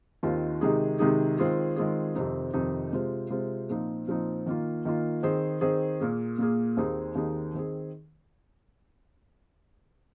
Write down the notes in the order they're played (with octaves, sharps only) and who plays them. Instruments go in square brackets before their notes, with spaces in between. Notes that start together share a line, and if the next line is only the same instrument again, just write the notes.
[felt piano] D#2 D#3 C4 F4 C5
C3 D#3 G#3 D#4 G#4
C3 D#3 G#3 D#4 G#4
D#3 G#3 C4 F4 G#4
D#3 G#3 C4 F4 G#4
F2 C3 D#3 C4 D#4
F2 C3 D#3 C4 D#4
C3 G#3 F4 C5
C3 G#3 F4 C5
A#2 F3 C4 D#4
A#2 F3 C4 D#4
D#3 A#3 F4
D#3 A#3 F4
D#3 C4 G#4 C5
D#3 C4 G#4 C5
A#2 A#3 G#4
A#2 A#3 G#4
D#2 D#3 C4 D#4 G#4
D#2 D#3 C4 D#4 G#4
D#3 C4 G#4